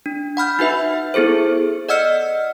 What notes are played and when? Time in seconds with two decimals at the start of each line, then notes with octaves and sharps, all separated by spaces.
0.06 D4
0.37 F#5 B5 F6 G6
0.59 D#4 F#4 B4 E5
1.14 B3 E4 G#4 A4 C5
1.89 D5 D#5 F#5 E6 F6 C#7